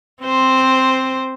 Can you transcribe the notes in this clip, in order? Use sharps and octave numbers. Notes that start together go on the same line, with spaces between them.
C4 C5